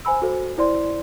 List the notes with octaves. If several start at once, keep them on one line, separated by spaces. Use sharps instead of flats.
C5 G#5 B5 E6
F#4 A4 C5
E4 C5 D5 C6